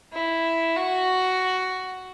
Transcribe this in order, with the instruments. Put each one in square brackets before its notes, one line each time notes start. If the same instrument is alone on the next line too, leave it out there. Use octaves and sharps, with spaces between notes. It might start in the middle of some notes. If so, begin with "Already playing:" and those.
[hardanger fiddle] E4
F#4